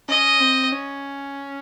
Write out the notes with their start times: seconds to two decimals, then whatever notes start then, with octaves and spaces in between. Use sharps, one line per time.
0.09 C#4 D#5
0.40 C4
0.72 C#4